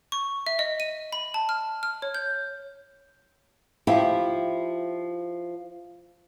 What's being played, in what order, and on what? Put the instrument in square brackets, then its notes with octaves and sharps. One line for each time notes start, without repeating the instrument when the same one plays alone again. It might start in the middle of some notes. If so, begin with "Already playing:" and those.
[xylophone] C#6
E5
D#5
D#7
B5
A5
F6
F6
C#5
G6
[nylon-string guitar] F3 E4 G4